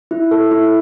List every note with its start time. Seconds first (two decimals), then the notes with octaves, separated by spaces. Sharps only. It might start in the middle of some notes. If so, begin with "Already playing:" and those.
0.11 E4
0.31 A4
0.51 E4